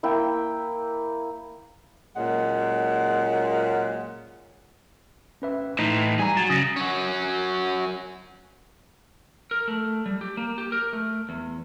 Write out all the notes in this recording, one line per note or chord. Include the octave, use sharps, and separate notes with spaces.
A#3 E4 G5
A#2 F#3 G#3 C#4 F#5
C#4 B4 E5
A2 E3 D#4
G3 G#4 A#5
F#3 A6
C#3 D#6 A#6
F#3 C#4
A#4
A3
G3
G4
A#3
G4
A#4
A3
E2